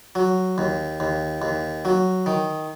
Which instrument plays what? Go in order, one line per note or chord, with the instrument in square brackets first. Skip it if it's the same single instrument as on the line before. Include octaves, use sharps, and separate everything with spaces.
[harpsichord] F#3
D#2
D#2
D#2
F#3
D#3